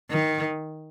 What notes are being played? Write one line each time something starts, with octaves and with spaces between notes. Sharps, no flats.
D#3